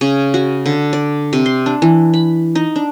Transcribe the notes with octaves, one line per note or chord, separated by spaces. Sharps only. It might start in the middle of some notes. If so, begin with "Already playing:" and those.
C#3
F#4
D3
D5
C3
C6
D4
E3
B5
D#4
D4